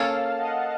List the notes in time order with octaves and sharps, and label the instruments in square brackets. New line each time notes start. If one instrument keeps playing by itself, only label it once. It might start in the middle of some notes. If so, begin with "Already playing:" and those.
Already playing: [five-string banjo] A#3 C#4 A4 C#5 [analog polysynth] F5 A5
[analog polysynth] D#5 F#5